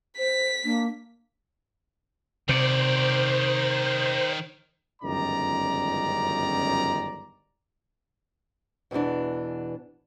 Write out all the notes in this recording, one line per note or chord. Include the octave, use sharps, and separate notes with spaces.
C5 B6
A#3 D4
C3 D#3 C5 D5
G1 C#2 F#2 D#3 D5 A#5
E2 B2 D3 E3 D4